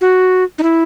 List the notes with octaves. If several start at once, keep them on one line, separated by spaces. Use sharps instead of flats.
F#4
D#4
E4